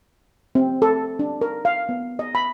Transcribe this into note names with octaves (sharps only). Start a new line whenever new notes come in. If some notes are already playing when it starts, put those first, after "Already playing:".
C4
A4
D4
A#4
F5
B3
D#5
B5